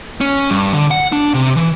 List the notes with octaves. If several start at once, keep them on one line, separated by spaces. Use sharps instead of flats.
C#4
G2
D3
F#5
D4
C3
E3